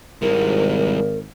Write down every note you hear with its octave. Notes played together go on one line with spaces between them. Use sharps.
G#1 G3 E4 A#4